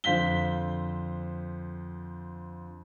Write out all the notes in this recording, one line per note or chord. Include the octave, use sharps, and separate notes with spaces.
F2 D3 C5 F5 B6 G7